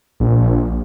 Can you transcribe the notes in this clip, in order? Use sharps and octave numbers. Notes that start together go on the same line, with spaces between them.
A#1